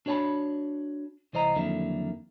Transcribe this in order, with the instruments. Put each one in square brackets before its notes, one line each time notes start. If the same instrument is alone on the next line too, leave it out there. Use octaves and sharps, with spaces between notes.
[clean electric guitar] D4 F#4 C#5 G#5 A5 B5
C2 E3 C5 D#5 A#5
F2 D3 D#3 F#3 A#3 E4